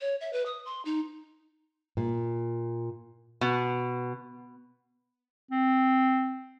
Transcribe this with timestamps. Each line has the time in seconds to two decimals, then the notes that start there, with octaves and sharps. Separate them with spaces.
0.01 C#5
0.21 E5
0.33 B4
0.46 D#6
0.65 C6
0.85 D#4
1.97 A#2
3.41 B2
5.51 C4